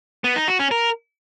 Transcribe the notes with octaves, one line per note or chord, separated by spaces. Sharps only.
B3
D#4
F#4
C#4
A#4